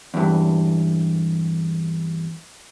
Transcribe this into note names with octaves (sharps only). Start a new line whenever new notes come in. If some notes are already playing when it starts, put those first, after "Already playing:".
E2 G2